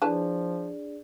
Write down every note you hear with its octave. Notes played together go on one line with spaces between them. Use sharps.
F3 D4 E4 G#4 B4 D5 A5